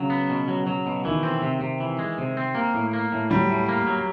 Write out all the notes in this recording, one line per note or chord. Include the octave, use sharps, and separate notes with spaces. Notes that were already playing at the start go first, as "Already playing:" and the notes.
Already playing: C#3 F#3
B3
B2
F#3
F#3
B2
D#3 E3
C4
C3
C3
E3
G#3
C3
C4
A#3
A2
A#3
A2
F#3 G3
A2
A#3
F#3